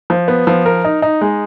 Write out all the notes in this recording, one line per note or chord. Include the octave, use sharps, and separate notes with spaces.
F3
B3
F3
A#4
D#4
D#4
G#3